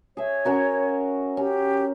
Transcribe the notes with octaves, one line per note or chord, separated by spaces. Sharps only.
G#4 C#5 E5
C#4 F#4 A#4
C#4 G4